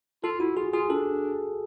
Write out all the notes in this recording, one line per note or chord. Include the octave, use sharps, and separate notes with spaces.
F4 A4
E4 F#4
F4 G#4
F4 G#4
D4 A4